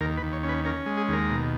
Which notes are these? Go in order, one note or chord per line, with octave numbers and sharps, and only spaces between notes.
D#2 A#4
B4
D#2
C#5
C#4
B4
C#4 A#4
G#3
G#4
D#2 A#4
B2